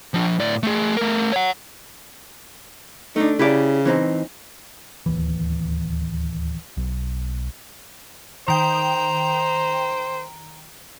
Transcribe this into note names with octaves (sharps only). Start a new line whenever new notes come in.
F3 D4
A2 D5
A3 G#4
A3 A#4
C#5 F#5
A3 D4 D#4
C#3 E4 G4 D5
E3 C4 D#4
D1 D#2 E3
B1
D#3 C5 G5 A#5